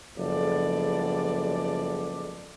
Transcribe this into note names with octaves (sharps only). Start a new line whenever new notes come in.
F#1 F3 G#3 B3 A4 D5